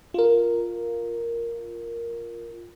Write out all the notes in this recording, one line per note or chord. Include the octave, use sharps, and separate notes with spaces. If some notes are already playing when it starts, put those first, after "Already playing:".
F4 A#4